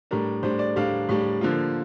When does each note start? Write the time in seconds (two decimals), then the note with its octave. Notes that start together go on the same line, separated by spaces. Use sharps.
0.11 A2 G3 D4 A#4
0.43 A2 G3 D4 C5
0.59 D5
0.76 A2 G3 D4 F5
1.09 A2 G3 D4
1.41 D3 F3 A#3 F4